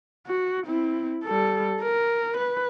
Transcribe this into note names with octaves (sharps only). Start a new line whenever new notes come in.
F#4
C4 E4
G3 A4
A#4
B4